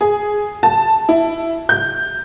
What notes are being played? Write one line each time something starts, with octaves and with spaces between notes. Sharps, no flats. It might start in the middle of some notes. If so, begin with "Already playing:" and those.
G#4
A5
E4
G6